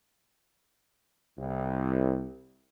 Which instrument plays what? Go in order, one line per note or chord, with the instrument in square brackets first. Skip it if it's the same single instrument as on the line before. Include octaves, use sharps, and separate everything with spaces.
[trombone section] C2